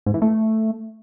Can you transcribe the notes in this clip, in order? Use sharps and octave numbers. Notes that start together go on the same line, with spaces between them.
G#2
E3
A3